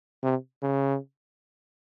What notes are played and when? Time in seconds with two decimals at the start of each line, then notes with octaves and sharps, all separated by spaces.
0.24 C3
0.62 C#3